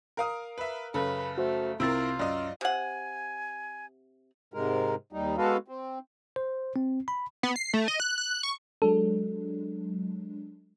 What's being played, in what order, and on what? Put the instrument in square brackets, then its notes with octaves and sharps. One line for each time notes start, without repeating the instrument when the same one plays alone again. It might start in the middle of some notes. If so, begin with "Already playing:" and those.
[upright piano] A#4 F5 D#6
[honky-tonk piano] B4 E5
[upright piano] F#2 C#3 [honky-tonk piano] A4 [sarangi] B4
[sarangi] A3 [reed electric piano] F#4 C5
[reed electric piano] C2 E6 A6 [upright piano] C3 [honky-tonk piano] C4 E4 A#4 [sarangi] F4
[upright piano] F#2 [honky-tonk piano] D5 D#5
[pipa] C3 F#5 [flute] G#5
[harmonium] G#2 C3 G#3 A#4
D#2 G3 D#4
G#3 B3 F#4 A4 B4 F5
C4
[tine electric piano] C5
C4
B5
[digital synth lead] B3
C7
A3
D#5
F#6
F#6
C#6
[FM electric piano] F#3 G#3 D4 [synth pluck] A4